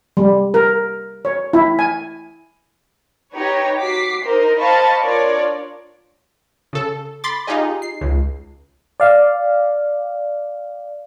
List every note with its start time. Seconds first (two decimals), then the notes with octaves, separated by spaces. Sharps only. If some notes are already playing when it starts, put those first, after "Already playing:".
0.17 G3
0.54 A#4
1.25 C#5
1.53 E4
1.79 G#5
3.34 D#4 G4 B4 C#5
3.79 F#4 D6 B6 C7
4.25 D#4 A#4 C5 D#5
4.59 C5 D#5 F5 A5 B5 C#6
5.02 D4 F4 A#4 C#5 D5 D6
6.73 C#3 A4
7.24 B5 C6 D6 A6
7.47 D#4 F4 G4 G#4 D#5
7.82 C7
8.01 C#2
9.00 D5 F5